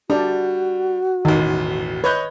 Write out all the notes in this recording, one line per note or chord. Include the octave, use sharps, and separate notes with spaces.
G3 D4 F#4
E1 A1 D#3
B4 C#5 D#5 G6